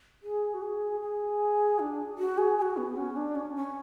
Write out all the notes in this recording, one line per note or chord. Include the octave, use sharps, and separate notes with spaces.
G#4
F#4
G#4
G#4
D4
F#4
G#4
G#4
F#4
B3
C#4
D4
C#4
C#4